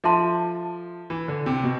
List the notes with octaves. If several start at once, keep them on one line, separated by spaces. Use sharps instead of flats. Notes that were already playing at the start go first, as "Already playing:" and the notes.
F3 A4 E5 A5 C6
E3
D3
C3
B2